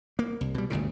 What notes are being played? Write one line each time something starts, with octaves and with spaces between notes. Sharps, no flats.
A#3
C2
B2 G3
G1 D2 A#2 C#3